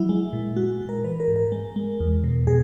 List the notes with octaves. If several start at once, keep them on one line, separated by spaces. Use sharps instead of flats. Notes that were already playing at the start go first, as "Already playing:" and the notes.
Already playing: F#3 E4
G#3
A#2
G#3 F#4
A#2
A#4
E3 B4
A#4
G#2
A#4
G#3
G#3
E2
B2
B2 G#4